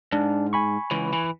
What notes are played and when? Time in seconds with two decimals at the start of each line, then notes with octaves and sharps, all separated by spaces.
0.12 G#2 D4
0.53 G#5 B5 C#6
0.91 C#2 E3
1.13 E3